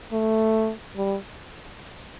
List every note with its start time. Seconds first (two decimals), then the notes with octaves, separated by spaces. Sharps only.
0.13 A3
0.97 G3